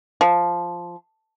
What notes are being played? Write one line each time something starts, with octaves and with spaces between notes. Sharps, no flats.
F3